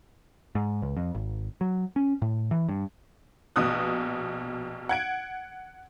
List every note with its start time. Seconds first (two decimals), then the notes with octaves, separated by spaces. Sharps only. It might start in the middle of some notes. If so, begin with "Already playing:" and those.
0.55 G#2
0.82 C#2
0.97 F2
1.15 G#1
1.61 F#3
1.96 C#4
2.22 A2
2.51 E3
2.69 G2
3.56 A#1 B2 D#6 F#6
4.89 F#5 G#6 D7